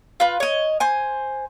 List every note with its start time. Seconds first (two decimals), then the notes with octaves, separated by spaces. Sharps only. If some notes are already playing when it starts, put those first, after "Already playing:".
0.20 F4 B4
0.40 C#5 D#5
0.80 C5 G#5